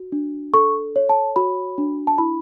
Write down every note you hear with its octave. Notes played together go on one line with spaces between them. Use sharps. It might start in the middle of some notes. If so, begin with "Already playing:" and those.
Already playing: F#4
D4
A4 C#6
C#5
A5
F#4 B5
D4
A5
E4 B5